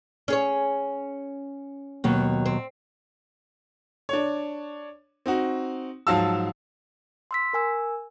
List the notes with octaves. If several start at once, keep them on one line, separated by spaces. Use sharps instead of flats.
C#4 G#4 C#5
D#2 B2 F#3
C4
D4 C#5
C4 D#4 F#4
G#2 F3 F#3 F5 A5 E6
C6 E6 B6
A#4 G#5 E6